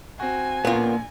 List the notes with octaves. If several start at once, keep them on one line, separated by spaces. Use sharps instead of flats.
C4 F#4 G#5
A#1 A#2 A#3 B3 C#4 F4